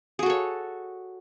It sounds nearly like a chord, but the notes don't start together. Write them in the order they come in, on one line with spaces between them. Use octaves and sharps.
G#4 F#4 A4 C#5